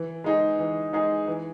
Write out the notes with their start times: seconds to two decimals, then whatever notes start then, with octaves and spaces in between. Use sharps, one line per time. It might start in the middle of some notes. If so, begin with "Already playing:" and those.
Already playing: E3
0.24 G#3 D#4 G#4
0.59 E3
0.93 G#3 D#4 G#4
1.27 E3